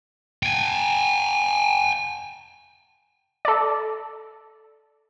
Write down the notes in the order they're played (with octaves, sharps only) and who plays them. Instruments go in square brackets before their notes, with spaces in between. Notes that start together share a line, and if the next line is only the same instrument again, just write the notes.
[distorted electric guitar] G5 G#5
[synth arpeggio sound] A4 D5